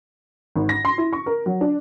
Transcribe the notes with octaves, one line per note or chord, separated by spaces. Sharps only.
G#1
A#6
C6
E4
C#6
A#4
F#3
D4